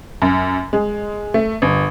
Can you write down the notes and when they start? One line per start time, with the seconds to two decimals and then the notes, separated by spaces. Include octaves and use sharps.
0.22 F#2
0.73 G#3
1.34 A3
1.62 G1